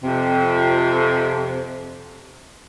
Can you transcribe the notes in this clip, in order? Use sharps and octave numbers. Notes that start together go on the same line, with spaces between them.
F2 C3